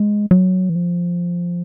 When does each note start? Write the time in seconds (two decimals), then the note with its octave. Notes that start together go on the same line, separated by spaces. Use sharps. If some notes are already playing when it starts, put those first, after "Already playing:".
Already playing: G#3
0.31 F#3
0.70 E3
0.75 F3